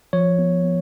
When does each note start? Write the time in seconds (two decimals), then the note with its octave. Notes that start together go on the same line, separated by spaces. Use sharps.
0.13 F3 C#5
0.39 B3
0.64 B3